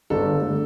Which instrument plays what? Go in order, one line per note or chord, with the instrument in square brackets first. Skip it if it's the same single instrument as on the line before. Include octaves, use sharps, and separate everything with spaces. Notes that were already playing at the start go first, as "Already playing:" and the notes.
[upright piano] G1 A4
D3
A3